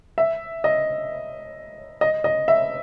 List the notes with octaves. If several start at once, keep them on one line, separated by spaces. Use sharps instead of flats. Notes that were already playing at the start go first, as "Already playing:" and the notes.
E5
D#5
D#5
D#5
E5